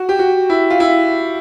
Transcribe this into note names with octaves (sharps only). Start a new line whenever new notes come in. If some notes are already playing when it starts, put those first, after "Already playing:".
Already playing: F#4
G4
F#4
E4
F4
E4